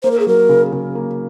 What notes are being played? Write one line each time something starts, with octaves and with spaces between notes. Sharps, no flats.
A#3 C5
A#4
G#4
F#3 A#4
C#3
C#3
A#3